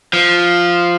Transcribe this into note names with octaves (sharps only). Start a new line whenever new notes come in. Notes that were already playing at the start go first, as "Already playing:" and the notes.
F3